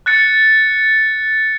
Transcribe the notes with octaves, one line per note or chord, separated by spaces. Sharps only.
F#6 A6 C#7